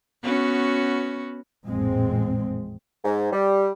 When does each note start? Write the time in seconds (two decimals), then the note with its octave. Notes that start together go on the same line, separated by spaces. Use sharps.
0.23 B3 C#4 F#4
1.66 A1 F2 A#2 G#3 C4
3.05 G#2
3.33 G3